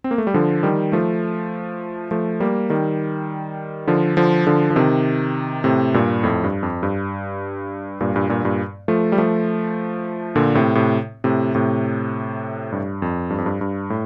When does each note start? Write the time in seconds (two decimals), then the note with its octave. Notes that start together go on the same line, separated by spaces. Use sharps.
0.04 C4
0.11 A#3
0.18 A3
0.27 G3
0.34 D3 F3
0.63 D#3 G3
0.92 F3 A3
2.11 F3 A3
2.40 G3 A#3
2.70 D#3 G3
3.87 D3 F3
4.17 D3 F3
4.47 D3 F3
4.70 F3
4.76 C3 D#3
5.64 A2 C3
5.94 G2 A#2
6.23 F2 A2
6.44 G2
6.63 F2
6.83 G2
8.00 G2 A#2
8.14 G2 A#2
8.29 G2 A#2
8.44 G2 A#2
8.88 F3 A3
9.12 G3
9.18 F3 A3
10.36 A#2 D3
10.55 A2 C3
10.75 A2 C3
11.24 A2 C3
11.55 A2 C3
12.72 G2
13.02 F2
13.30 G2
13.38 F2
13.46 G2
13.61 G2
13.90 A2